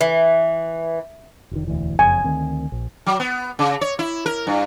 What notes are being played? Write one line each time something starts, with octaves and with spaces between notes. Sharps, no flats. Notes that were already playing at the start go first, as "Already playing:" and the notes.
E3
F1 D#3
E1 D2 E3
F#1 F2 G#5
D2 D#3 C4
A#1
F#3
B3
C#3
C#5
E4
A#4
G2